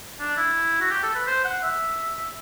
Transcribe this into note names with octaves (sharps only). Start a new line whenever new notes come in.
D4
E4
F#4
G4
A4
B4
C5
F#5
E5